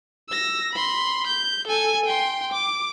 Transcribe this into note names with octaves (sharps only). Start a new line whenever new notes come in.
E6 A#6
B5 C6
G6
A4 G#5
G5 C6
D6